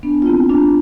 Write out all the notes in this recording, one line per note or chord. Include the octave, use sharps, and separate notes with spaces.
B3 D4
F4
C4 E4
D4 F4